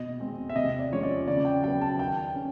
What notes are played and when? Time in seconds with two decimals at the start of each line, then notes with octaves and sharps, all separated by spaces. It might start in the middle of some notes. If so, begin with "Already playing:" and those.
Already playing: B2 D#5
0.20 G#3 C4
0.49 E5
0.55 C3 D#5
0.79 D5
0.91 F3 G#3 C#4 C#5
1.03 D5
1.28 C#3 D5
1.45 G5
1.63 F#3 B3 G5
1.81 A5
1.99 D#3 G5
2.35 C#4